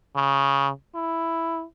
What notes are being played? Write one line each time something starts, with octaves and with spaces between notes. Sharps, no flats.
C#3
E4